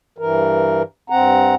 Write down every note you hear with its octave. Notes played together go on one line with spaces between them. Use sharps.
G2 E3 A#4
G2 C4 F#5 A#5